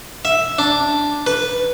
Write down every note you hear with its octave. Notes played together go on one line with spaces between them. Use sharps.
E5
D4
B4